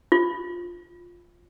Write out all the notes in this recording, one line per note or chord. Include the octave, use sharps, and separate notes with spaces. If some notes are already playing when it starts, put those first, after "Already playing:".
F4